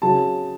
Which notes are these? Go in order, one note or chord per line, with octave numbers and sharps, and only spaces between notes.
C#3 F#3 A5